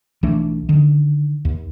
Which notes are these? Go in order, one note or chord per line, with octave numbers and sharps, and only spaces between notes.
B1 E3 A3 D4
D3 D#3
D#2